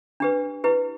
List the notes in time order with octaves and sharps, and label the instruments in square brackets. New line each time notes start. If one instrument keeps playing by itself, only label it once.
[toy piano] D4 G4 B4
E4 G4 B4